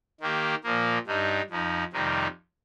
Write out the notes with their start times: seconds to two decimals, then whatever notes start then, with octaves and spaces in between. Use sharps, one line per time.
0.21 D#3 A#3 G4
0.64 A#2 F3 A#3
1.07 G2 G3 D#4
1.50 F2 F3 D#4
1.93 F2 C3 D#3 G3 D#4